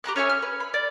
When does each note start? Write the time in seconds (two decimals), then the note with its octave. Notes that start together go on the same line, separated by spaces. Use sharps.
0.04 G4 A#5 B5 F#6
0.16 C#4 C#5 E5 G#5
0.29 F6
0.42 B4
0.60 B5
0.74 D5